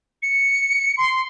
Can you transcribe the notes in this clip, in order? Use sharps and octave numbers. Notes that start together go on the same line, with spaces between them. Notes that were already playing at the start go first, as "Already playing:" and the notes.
C#7
C6